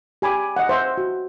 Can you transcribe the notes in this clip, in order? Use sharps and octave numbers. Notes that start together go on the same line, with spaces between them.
G4 G#5 B5 D6
D#5 F#5
C5 E5
F#4